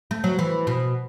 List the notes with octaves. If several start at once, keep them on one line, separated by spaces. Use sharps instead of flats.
A3
F#3
E3
B2